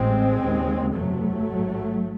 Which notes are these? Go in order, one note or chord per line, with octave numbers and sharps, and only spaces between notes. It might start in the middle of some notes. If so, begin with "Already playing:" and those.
Already playing: A1 A2 G#3 C4
D#2 C#3
F#1 E2 C3 F#3 A3
A1 G#2